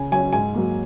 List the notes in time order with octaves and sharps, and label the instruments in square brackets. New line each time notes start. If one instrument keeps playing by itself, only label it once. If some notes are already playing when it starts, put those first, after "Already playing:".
Already playing: [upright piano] C#3 G#5
F#3 C#4 G#5
G#2 G#5
F#3 A#3